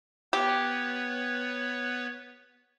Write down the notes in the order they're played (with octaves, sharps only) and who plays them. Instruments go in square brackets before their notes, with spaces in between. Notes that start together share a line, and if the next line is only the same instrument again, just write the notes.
[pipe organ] B3 B4 C#5 [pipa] G4